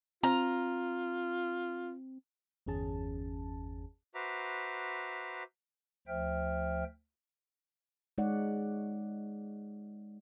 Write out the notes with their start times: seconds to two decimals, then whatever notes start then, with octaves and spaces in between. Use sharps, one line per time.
0.23 C4 F4 A#5
2.66 G1 E2 C#4 G#4 A5
4.15 F#4 B4 C5 E5 A#5 D6
6.08 D2 F3 C5 E5 G5 F6
8.18 G#3 D#4 C#5 D5 F#5